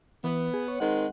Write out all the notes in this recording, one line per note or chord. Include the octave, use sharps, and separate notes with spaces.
E3 B3
G#4
C#5
D#3 G#3 C4 F#5